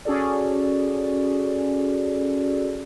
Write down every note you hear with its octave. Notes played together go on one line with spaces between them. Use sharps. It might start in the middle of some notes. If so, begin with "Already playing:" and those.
C#4 F#4 G#4 A4 D5